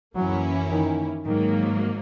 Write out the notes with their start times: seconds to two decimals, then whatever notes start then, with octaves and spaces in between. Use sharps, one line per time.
0.15 F#2 E3 F#3 A#3 C#4 E4
0.70 D#3
1.26 G#2 D#3 F#3 A#3